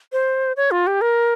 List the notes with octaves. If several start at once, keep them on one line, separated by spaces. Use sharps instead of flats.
C5
C#5
F4
G4
A#4